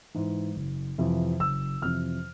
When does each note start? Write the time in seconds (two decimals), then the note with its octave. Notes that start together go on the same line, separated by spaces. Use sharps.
0.14 G#2 E3
0.56 F#1
0.98 F2 C3 E3
1.39 F#1 E6
1.82 F2 C3 E3 F6